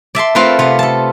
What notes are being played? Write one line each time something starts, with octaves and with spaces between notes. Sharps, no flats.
D5 E5 A5 C6
A3 C4 F4 A#4 B4
C3 B3 F4
A4 A5